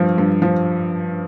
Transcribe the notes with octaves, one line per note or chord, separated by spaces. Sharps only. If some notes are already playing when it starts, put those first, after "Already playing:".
Already playing: G2 F3
G2
F3